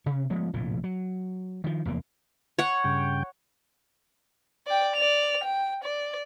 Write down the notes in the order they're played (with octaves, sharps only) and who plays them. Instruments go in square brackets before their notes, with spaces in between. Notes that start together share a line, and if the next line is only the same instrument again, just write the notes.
[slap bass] C3 C#4
F3 G#3 A3 B3
F1 A#1 A2 F3
F#3
D#3 F3
F1 E2 A#3
[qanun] C#5 F#5
[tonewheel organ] G2 C#3 G5
[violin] D5 G5
D5 F7
G5
D5